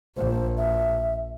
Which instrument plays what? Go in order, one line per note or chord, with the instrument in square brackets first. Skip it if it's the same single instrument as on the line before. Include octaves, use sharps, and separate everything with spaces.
[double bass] A#1 [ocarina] C5
[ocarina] E5